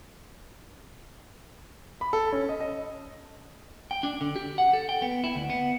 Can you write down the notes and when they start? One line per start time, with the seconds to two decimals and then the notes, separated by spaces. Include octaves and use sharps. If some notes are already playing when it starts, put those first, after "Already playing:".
2.01 B5
2.13 A4
2.33 C#4
2.49 D#5
2.60 D#5
3.91 G5
4.03 D4
4.21 D3
4.36 G4
4.58 F#5
4.73 A4
4.89 G5
5.02 B3
5.24 E4
5.36 D2
5.50 B3